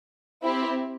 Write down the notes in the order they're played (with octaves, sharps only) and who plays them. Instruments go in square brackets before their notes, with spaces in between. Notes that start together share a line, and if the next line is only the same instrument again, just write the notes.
[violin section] C4 E4 G4